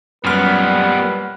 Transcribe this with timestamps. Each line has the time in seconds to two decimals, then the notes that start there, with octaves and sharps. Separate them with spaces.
0.24 F#2 A#2 G3 B3 B4 F6